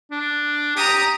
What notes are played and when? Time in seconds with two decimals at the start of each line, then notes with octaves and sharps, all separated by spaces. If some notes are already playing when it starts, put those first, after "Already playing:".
0.12 D4
0.77 G4 A#5 D#6